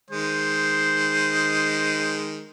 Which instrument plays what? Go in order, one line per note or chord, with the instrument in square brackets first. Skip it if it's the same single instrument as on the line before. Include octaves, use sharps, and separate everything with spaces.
[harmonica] D#3 G#3 [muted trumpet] C5